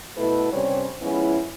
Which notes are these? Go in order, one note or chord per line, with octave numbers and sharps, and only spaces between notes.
B2 A3 E4 A4 B4
G2 C3 G3 C#4 C5 C#5
F3 G#3 B3 C#4 E4